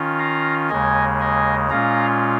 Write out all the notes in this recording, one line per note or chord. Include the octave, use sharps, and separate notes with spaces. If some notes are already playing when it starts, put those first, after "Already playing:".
Already playing: D#3 C#4 F4
F5 A#5
D#2 C#3 G#3 D#5 G#5
D#5 G#5
A#2 G#3 C#4 F4 F5 A#5